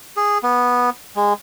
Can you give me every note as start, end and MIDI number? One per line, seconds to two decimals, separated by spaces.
0.17 0.38 68
0.43 0.90 59
1.16 1.33 56